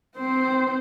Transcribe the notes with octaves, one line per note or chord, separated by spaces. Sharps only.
C4 C5